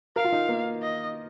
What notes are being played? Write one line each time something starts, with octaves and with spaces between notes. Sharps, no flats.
A#4 F5
F4
D#4
A#3
D#5